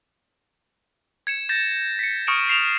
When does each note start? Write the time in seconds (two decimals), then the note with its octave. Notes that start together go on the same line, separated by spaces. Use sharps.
1.27 G#6 C#7 E7
1.49 G6 A6 A#6 E7
1.99 B6 C#7
2.27 C#6 D#6 F6 C#7 D7 E7
2.49 C7 C#7 E7 F7